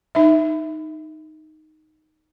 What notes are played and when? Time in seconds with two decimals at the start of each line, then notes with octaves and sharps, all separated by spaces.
0.15 D#4 E5